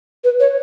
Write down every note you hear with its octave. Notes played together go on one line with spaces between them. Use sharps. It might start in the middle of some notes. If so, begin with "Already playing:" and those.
B4
C#5